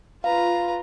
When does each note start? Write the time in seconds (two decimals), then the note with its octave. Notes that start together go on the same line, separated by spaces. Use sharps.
0.24 F4 B4 F5 A#5